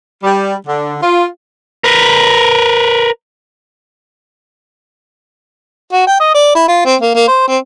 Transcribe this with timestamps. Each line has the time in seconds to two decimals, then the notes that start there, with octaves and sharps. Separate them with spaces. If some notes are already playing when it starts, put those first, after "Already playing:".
0.23 G3
0.66 D3
1.01 F4
1.84 A#4 B4
5.93 F#4
6.07 G5
6.20 D#5
6.34 D5
6.55 E4
6.68 F4
6.85 C4
7.01 A#3
7.15 A#3
7.28 C5
7.48 C4